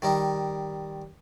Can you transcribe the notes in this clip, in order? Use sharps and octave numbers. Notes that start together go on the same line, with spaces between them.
D#3 G3 D#4